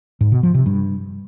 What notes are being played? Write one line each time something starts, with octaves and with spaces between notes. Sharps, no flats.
G#2
B2
F3
C3
G2